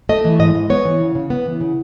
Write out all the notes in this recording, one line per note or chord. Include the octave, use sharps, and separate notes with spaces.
A3 D#5
E3
G#2 D#5
G#2
B3 C#5
E3
C#3
C#3
B3
E3
C#3